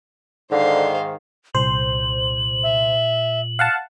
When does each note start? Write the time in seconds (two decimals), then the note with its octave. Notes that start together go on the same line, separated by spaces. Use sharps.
0.51 G#2 D3 D#3 C5 F5
1.55 C2 A#2 C5 F#7
2.63 E5
3.59 F5 F#5 A5